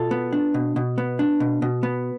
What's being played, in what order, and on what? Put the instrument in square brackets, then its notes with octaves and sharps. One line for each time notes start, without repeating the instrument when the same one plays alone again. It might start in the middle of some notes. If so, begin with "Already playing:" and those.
Already playing: [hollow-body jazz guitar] B2 F4 A4
B3
D4
B2
B2
B3
D4
B2
B2
B3